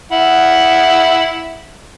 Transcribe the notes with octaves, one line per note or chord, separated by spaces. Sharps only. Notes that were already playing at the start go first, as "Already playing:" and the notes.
E4 F#5